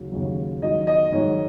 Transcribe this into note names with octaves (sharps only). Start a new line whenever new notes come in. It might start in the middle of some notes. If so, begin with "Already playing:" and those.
Already playing: D#2 C#3 F#3
D#2 C#3 F#3
G#2 D#3 F#3 D#5
D#5
G#2 D#3 F#3 C#5